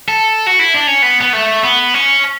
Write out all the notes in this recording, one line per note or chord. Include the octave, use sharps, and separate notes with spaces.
A4
F#4
E4
D4
C#4
B3
B3
A3
B3
C#4